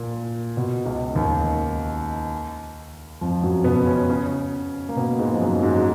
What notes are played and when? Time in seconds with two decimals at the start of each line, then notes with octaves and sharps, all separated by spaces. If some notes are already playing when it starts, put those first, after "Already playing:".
Already playing: A#2
0.57 B2
0.85 C#2 C#3
1.15 D#2 D#3
3.21 F2 F3
3.43 F#2 F#3
3.64 B2 B3
3.86 C#3 C#4
4.09 C#3 C#4
4.89 A#3
4.96 B2 B3
5.19 G#2 G#3
5.33 F3
5.41 F#2 F#3
5.59 F#3
5.63 G#2 G#3
5.77 G#3